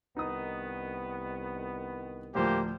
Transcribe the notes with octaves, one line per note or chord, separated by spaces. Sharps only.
C2 D#3 B3 D#4 D#6
D2 A2 F3 A#3 G4 C5